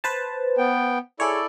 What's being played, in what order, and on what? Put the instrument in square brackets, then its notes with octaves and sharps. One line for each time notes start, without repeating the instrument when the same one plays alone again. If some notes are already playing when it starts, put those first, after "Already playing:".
[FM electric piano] B4 C5 A5
[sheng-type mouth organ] B3 G5
[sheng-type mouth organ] E4 A4 D5 [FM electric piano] G#4 C#5